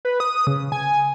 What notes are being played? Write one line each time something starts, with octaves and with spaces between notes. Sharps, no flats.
B4
D#6
C#3
G#5